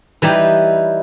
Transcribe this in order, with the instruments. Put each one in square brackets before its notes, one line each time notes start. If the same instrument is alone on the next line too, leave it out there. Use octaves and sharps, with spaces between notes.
[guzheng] E3 G3 D#4 G4